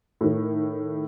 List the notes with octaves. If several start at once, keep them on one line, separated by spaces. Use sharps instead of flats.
A2 D#3